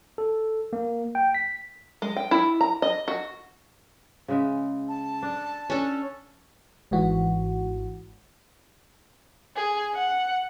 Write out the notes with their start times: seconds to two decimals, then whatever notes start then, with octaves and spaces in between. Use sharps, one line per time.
0.18 A4
0.73 A#3
1.15 G5
1.35 B6
2.02 G#3
2.16 G5
2.31 E4
2.61 A#5
2.82 D#5
3.08 F#4
4.28 C#3 G#3 E5
4.88 A5
5.22 D4
5.70 C#4 D4 A4
6.91 G#1 G#2 E3 F#4
9.56 G#4
9.95 F#5